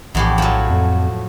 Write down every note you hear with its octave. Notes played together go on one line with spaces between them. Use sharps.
A#1 E2 A2 G4
F3 F#3
F2